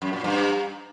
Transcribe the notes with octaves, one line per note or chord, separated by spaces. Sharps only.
F#2
A#2
G2